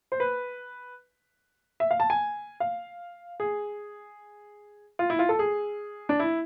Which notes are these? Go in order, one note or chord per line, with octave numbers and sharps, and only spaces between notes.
C5
B4
E5
F5
A5
G#5
F5
G#4
F4
E4
F4
A4
G#4
D4
E4